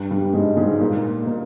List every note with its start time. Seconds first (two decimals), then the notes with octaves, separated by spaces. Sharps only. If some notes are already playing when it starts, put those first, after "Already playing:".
Already playing: G2 G3
0.10 G2 G3
0.34 G#2 G#3
0.57 G#2 G#3
0.80 A#2 A#3
1.27 A#2 A#3